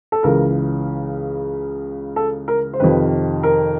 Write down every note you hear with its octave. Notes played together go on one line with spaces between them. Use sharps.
A4
C#2 C#3 E3 A#4
A4
A#4
C5
F2 C3 D#3 B4
A#4